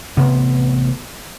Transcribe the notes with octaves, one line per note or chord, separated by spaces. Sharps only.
A1 C3 B3 C4